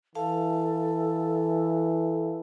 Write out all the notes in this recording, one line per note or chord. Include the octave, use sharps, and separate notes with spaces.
E3 A4 F5 A5